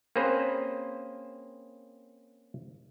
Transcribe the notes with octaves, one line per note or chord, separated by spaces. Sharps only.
A#3 C4 C#4 G#4 B4 C5